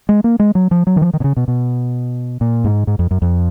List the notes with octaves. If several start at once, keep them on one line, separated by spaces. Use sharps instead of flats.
G#3
A#3
G#3
F#3
F3
F#3
D#3
F3
D#3
B2
C#3
B2
B2
A#2
G#2
G#2
F2
F#2
F2